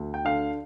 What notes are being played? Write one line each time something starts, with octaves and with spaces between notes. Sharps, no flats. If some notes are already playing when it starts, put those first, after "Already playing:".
Already playing: D2
G5
D3 F5